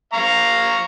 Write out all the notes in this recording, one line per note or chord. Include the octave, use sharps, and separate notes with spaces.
F5 A#5 C#6